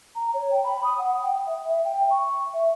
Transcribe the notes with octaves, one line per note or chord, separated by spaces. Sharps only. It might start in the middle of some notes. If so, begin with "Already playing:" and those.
A#5
C#5
G5
B5
D#6
F#5
G5
E5
E5
G5
C#6
E5